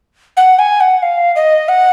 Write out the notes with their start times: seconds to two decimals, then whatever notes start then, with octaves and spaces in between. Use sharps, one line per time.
0.37 F#5
0.59 G#5
0.80 F#5
1.02 F5
1.36 D#5
1.69 F#5